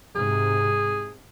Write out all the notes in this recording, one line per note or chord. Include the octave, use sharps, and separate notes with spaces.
G#2 C3 G#4